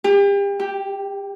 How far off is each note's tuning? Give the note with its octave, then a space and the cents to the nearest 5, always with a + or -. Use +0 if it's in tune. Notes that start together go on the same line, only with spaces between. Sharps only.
G4 +35
G4 +0